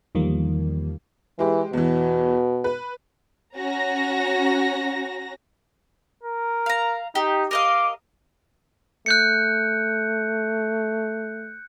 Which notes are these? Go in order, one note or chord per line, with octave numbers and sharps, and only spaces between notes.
E2 D#3 F3 G3 A#3
E3 G#3 G4
E2 B2 E3
B4
C#4 F#4 A#5 A#6
A#4
F5 A#5
D#4 G4
A#4 D#5 F5 D6
A3 F#6 G6 C#7